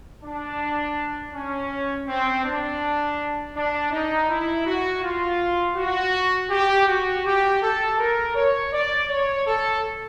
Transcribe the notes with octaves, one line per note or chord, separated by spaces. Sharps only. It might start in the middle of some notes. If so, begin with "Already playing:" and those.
D4
C#4
C4
D4
D4
D#4
E4
F#4
F4
F#4
G4
F#4
G4
A4
A#4
C#5
D5
C#5
A4